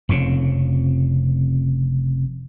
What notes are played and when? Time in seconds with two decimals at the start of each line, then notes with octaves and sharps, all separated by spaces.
0.09 F1 F2 C#3